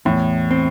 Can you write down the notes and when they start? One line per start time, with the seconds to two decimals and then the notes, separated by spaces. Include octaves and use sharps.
0.05 E2 A2
0.51 C4